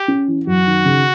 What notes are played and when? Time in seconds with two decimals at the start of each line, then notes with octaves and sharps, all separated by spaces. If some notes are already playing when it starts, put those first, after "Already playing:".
Already playing: G4
0.08 C#4
0.28 E3
0.47 F#2 F#4
0.66 D#3
0.85 C#3